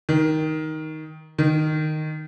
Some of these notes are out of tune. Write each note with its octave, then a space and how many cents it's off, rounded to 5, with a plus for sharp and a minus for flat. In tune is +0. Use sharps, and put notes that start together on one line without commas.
D#3 +10
D#3 -10